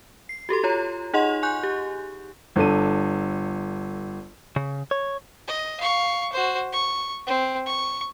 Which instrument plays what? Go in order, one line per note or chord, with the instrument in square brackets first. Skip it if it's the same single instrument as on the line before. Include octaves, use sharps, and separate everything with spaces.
[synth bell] C7
F#4 G4 A4 C6
F4 C#5 A#5
D#4 G#4 D#5 F#5 C6 F7
G#5 C#6 F#6 G6
G4
[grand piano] G1 D4 A4 D#7
[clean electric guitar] C#3
C#5
[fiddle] D#5
F5 C#6
F#4 C5
C#6
C4
C#6